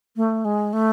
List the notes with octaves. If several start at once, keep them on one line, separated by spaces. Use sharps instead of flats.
A3
G#3
A3